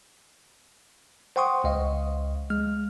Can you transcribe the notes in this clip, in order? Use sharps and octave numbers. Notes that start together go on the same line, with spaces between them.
C5 F#5 G5 C6 C#6 D#6
C#2 D#5 F5
G#3 F6